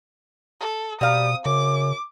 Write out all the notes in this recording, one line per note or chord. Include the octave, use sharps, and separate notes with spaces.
A4
B2 G3 C4 F5 A#5 D#6
F#2 C#3 D6